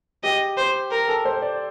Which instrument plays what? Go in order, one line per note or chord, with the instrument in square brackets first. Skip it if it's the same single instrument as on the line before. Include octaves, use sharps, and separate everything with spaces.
[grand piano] G4 [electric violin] D#5
[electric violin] C5
A#4
[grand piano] A4
C5
D5